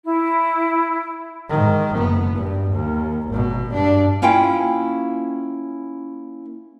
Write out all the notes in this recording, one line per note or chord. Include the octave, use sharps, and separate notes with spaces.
E4
G#2 D#3
F#1 B3
G2
D#2
G#1 B2
G2 D4
A#3 C#4 E4 F4 F5 G5